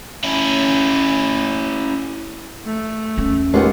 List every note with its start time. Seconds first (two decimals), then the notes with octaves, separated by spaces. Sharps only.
0.24 C#4 E4
2.65 A3
3.18 E2 C#4
3.54 D#2 G#3 B3 F4 F#5